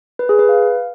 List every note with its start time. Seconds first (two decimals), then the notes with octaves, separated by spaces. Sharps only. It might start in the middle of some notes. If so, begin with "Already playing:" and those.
0.19 B4
0.29 G#4
0.39 B4
0.49 F5